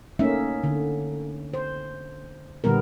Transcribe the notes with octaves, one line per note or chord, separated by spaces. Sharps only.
A3 A#3 C#4 D#4 E5
D3
C5
A#2 D3 G3 B3 A#4